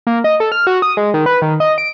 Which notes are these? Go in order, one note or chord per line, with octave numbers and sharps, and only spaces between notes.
A#3
D#5
A4
F6
F#4
D#6
G#3
D#3
B4
D#3
D#5
D7